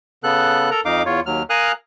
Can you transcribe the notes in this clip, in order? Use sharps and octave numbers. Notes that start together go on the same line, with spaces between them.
C#3 B3 A4 F#6
A4 A#4 A#5
F2 D#4 F5 D6
E2 F4 C#5
D#2 F#3 F6
A#4 F5 G#5 D#6 F6 F#6